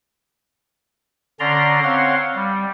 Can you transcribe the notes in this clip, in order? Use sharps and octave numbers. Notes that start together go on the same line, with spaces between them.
D3 C#4 D5 A#5 C6
C4 C#5 F5 F#5 C6
G3